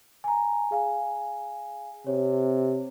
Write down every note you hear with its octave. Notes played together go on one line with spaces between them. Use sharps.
G#5 A#5
G#4 F5 G#5
C3 C#5